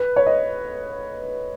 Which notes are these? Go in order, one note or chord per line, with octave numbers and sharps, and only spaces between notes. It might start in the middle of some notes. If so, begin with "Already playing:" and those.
Already playing: B4
C#5
D#5